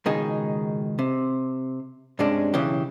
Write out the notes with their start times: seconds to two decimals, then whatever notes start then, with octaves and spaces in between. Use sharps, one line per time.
0.06 C#2 B2 D#3 G#3 D#4 G#4
0.99 C3
2.19 G2 C3 G3 G#3 C#4 D4
2.54 B1 C#3 E3 G4